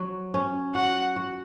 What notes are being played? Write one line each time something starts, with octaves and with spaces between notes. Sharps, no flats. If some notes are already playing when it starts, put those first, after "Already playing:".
Already playing: F#3
C#4
F#4 F#5
F#4